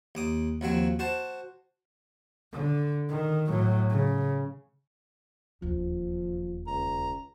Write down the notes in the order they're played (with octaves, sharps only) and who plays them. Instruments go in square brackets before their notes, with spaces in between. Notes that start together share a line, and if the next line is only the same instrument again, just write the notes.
[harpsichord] D#2 D6 D#6
D#2 F3 F#3 C4
F#4 C5 A5
[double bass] D3
D#3
A2 F#3
C#3
[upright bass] E1 D#2 [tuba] F3
[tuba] C#2 [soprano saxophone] A#5